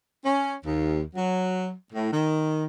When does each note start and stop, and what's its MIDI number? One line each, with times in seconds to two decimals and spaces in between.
0.23 0.55 61
0.64 1.01 39
1.16 1.72 54
1.92 2.10 45
2.11 2.66 51